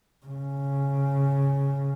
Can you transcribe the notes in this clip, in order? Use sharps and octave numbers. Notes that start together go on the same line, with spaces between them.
C#3